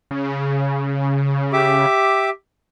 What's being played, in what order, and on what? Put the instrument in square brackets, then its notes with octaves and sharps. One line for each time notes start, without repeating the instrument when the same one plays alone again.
[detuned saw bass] C#3
[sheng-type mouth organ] G4 E5 D6